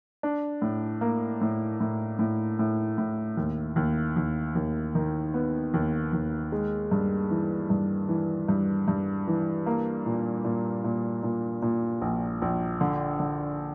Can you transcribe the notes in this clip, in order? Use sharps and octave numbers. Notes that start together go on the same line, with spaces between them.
D4
A2
A#3
A2
A2
A2
A2
A2
D#2
D#2
D#2
D#2
D#3
B3
D#2
D#2
G#3
G2
E3
G2
E3
G2
G2
E3
A#3
A#2
A#2
A#2
A#2
A#2
A#1
A#1
D3
D3